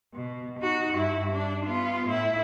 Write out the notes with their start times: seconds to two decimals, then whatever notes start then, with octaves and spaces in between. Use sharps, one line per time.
0.14 B2
0.59 D#4 F#4
0.95 G2 E4
1.32 D4
1.66 B3 F4
2.07 A2 E4